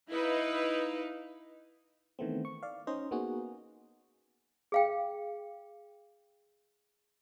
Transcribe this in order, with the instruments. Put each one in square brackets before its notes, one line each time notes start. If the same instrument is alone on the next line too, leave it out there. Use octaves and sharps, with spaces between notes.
[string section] D#4 E4 B4 F5
[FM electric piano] D#3 E3 A3 B3 C4
C#6
D5 F5
C#4 D#4 C5 D#5
A#3 B3 D#4 F#4 G#4
[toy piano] G#4 F5 G5